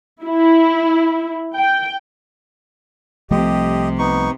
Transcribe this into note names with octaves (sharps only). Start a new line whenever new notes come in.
E4
G5
C2 C3 F3 A3 G4 D#5
B3 D#4 C#6